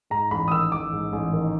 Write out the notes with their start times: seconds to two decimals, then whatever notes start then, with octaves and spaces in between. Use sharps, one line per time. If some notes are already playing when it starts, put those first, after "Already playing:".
0.10 G#2 A#5
0.31 A1 B5
0.48 D#6
0.52 D#3 E6
0.72 A1 D6
0.92 G#2
1.13 A1
1.33 D#3